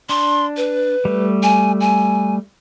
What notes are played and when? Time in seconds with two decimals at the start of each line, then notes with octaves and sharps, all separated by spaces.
0.09 D4 C6
0.57 B4
1.05 G3 A3
1.43 G#5
1.80 G#5